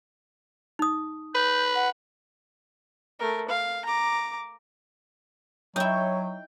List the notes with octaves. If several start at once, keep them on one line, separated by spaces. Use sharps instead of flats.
D#4 D#6
B4 G6
F#5
A3 A#4
F5
A#5 D6
F#3 D#4 E4 C#5 G5